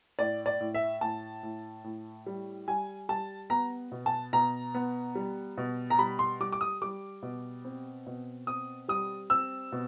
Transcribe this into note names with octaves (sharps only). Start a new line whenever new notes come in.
A2 D5
D5
A2
E5
A2 A5
A2
A2
G3
G3 G#5
G3 A5
B3 A#5
B2
A5
B2 A#5
B3
G3
B2
A#5
G3 B5
C6
G3 D6
D6
D#6
G3 D6
B2
C4
B2
C4 D#6
G3 D#6
C4 E6
B2